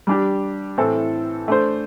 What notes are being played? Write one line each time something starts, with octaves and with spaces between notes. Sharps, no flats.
G3 D4 G4
A2 E3 C4 A4
A3 D4 C5